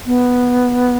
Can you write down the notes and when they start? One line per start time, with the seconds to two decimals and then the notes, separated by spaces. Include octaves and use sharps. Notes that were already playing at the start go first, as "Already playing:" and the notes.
0.06 B3